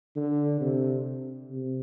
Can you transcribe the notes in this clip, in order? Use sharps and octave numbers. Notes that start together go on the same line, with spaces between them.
D3
C3
C3